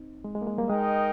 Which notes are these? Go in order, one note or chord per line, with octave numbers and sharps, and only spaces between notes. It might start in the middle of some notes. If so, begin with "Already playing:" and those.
Already playing: C4 D#4
G#3
G#3
A#3
G#3
G3 A#3
G#3 D#4 A#4 D#5 G5